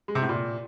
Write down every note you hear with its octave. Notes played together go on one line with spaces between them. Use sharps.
G#3
C3
A2
A#2